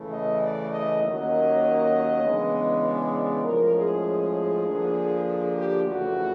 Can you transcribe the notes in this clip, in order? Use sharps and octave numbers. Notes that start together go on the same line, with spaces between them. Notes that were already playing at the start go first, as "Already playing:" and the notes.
Already playing: C#3 E3 A3
D#5
D5
D#5
D#2 D#3 F#3 A#3 C#4 D#5
C#3 E3 G#3 B3 D4
D5
D5
A2 F3 G#3 C#4 A#4
G#4
D3 F3 A#3 D4
G#4
G4
F2 C#3 E3 A3 F#4